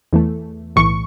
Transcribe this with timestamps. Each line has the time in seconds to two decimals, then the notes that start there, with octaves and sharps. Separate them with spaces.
0.13 E2 E3 A3
0.76 B1 A2 E3 C#6